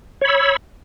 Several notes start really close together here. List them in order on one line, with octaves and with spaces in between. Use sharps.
C#5 B5 E6